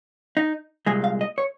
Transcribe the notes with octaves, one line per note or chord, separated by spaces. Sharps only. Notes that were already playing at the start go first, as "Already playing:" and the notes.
D#4
C2 A#2 G#3 G#4
F5
D#5
C#5